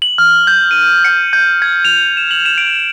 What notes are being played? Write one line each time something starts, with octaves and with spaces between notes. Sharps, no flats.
F#7
F6
G6
D#7
C#7
G6
G#6
F7
E7
F#7
E7
D7